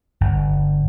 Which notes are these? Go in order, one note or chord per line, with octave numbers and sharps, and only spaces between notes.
G1